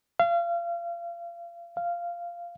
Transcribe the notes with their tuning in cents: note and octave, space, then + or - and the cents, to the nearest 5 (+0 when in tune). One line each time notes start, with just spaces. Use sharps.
F5 -30
F5 -10